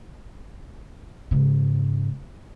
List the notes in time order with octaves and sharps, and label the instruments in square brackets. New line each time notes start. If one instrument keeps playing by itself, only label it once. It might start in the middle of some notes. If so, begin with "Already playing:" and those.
[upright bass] G#2 C#3